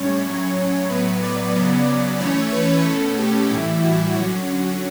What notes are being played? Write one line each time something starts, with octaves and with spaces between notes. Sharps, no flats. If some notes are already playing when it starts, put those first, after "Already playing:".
Already playing: A2 G3 C#4 C#5
A2 F#3 C#4
A2 F#3 B3 B4
D5
C#3 F#3 B3
E3 A3 C#4 C#5
B4
B2 A3 C#4 A4
G4
A2 E3 G3 E4
F#4
D3 F#3 C#4 F#4